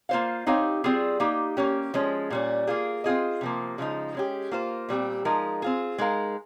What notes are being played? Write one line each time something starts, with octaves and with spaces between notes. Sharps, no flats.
A#3 F4 C5 F5
C4 D#4 G4 C#5 F5
G3 C4 F4 G#4
A#3 D#4 G4
A#3 C#4 G4
F3 G#3 C#4
A#2 G3 C#4
A#3 F4 G#4
C4 F4 G#4 D#5
C3 F3 A#3
C#3 F3 G#3 D#4
G#3 C#4 G4
A#3 F4 C5
A#2 G3 C4 G4
F3 G#3 D#4 A#4
C4 F4 G#4
G#3 D#4 A#4 F5